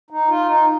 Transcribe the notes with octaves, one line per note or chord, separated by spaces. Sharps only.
D#4
F4
D#4